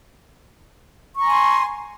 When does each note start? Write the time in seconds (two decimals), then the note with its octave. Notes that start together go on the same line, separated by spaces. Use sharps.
1.15 C#6
1.20 A#5
1.25 G#5
1.30 C6